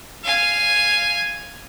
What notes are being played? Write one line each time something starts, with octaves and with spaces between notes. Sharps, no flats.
F5 G#5